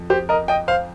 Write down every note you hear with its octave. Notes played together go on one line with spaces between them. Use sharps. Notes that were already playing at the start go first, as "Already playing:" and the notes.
Already playing: F2
G4 C5
A#4 D#5
D#5 G5
C5 F5